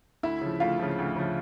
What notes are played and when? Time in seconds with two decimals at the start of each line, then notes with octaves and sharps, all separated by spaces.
0.23 D2 E4 E5
0.41 C#3 F3
0.60 D2 F4 F5
0.79 C#3 F3
0.98 D2
1.16 C#3 F3